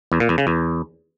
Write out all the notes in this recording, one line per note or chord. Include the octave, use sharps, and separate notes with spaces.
E2
A#2
E2
C#3
E2